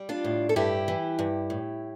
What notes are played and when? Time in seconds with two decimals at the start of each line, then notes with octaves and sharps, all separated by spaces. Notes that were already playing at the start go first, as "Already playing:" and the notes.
Already playing: G3
0.09 D4 F4
0.24 A2
0.49 A4
0.56 G2 E4 G4
0.88 E3
1.19 G2
1.50 A2